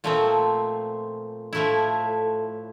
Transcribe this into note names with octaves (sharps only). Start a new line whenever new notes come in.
A#2 F3 A3 C4
A2 F3 A3 E4